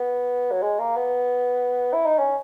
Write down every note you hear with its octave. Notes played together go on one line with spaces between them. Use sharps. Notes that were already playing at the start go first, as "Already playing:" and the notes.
Already playing: B3
F#3
G#3
A#3
B3
E4
D#4
C#4